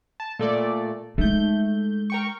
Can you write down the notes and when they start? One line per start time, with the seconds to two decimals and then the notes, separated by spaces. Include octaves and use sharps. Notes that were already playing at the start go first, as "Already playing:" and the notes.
0.20 A5
0.39 A#2 A3 D5
1.18 G#3 A3 D#4 G6
2.10 A#4 G5 C#6